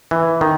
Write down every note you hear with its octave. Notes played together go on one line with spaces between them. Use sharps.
E3
D#3